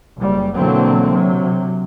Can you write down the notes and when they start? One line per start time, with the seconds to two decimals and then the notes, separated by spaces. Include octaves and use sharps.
0.17 F#1 G3
0.55 B2 D3 E3 F#3 A#3 C4
1.13 C3 F#3